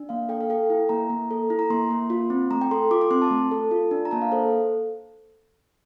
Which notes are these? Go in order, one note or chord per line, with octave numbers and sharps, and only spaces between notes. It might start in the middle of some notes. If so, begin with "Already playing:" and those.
Already playing: D4
A#3 F5
A4 G5
F5
A4 G5
E4
A#3 A#5
A#3
A4
E4
A#5
A#3 C6
A#3
F4
C4
A3 A#5
G5
A4 C6
F4 D6
D6
C4 C6
A5
A3
A4
F4
D4
A#5
A#3 A5
F5
A4 C5